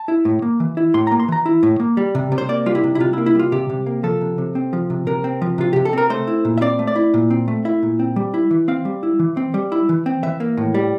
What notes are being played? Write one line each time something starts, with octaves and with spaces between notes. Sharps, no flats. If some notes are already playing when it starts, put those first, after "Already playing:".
Already playing: A5
E4
A2
A#3
E3
E4
A2 C6
A#3 A#5
C6
E3 A#5
E4
A2
A#3
G3
C3
C3
C5
A#3 D5
G3 F4
E4
C3
E4
C3 F4
E4
A#3
E4
G3 F4
C3 G4
C3
A#3
F3 A4
C3
C3
C4
F3
C3
C3 A#4
C4
F3
C3 F4
C3 G4
A4
C4 A#4
A3 C5
E4
A#2
E5
C4 D5
A3
D5
E4
A#2
C4
A3
E4 E5
A#2
C4
G3
E4
E3
C4 F5
G3
E4
E3
C4
G3
E4
E3
C4
E3 E5
A#3
A2
G3